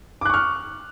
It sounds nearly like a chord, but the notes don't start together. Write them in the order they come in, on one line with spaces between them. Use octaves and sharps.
D6 F#6 C#6 F6